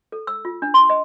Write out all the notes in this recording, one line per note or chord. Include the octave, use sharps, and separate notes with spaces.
A4
E6
F4
D4
C6
D#5